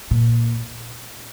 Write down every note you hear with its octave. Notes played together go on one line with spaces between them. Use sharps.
A#2